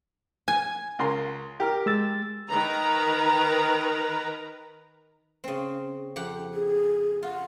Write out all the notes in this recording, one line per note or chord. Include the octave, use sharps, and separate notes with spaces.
G#5
C#2 A#4 C6
G4 A#4 F6
G#3 E6 A6
D#3 A#4 B4 A#5
C#3 C4
F2 G4 F#5
G#4
F4 F#5